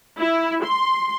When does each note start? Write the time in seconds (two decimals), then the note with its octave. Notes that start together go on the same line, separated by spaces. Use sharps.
0.19 E4
0.64 C6